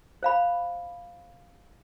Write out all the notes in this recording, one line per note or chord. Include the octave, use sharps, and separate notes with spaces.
C5 F5 B5